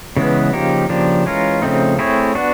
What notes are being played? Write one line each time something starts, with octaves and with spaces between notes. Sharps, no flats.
C#3 E3 G#3 B3
C#3 F3 A#3 D#4 G4
C#3 F3 A#3 D4 G4
E3 G#3 C#4 F4 A#4
C#3 F3 A3 C4 D#4
A3 C4 E4 G#4 C#5
B3 D4 F#4